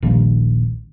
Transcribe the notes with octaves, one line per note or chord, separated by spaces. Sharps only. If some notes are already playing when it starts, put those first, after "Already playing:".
D#1 A#1 D#2